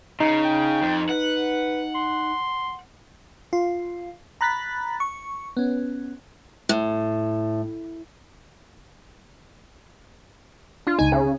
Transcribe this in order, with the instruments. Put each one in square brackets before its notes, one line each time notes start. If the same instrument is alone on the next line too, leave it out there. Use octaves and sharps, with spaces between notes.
[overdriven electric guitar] C#3 [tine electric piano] D#4
[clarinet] G5
[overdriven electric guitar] F2
[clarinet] B4 [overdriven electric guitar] F#5
[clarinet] C6
[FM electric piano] F4
A#5 B5 F#6 A6 B6
C#6
B3 C#4
[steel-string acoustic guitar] A2
[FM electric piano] D4 [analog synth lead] F4
[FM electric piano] C#2 D#4 [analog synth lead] G#5
[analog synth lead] C#3 [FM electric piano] G#5